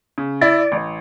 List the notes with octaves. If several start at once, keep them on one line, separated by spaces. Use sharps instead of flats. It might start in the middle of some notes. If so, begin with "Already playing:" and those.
C#3
E4 D5
A1